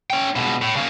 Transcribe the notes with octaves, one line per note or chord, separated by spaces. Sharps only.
C#4 G5
C#2 B2
A2
C#3 A#3